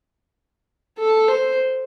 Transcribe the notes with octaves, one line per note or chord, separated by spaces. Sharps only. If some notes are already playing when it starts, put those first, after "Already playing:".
A4
C5